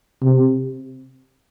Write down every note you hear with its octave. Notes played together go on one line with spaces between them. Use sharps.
C3